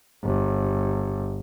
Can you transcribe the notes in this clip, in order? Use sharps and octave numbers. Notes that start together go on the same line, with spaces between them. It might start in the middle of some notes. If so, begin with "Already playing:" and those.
G1